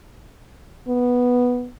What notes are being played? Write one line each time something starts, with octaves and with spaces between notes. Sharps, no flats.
B3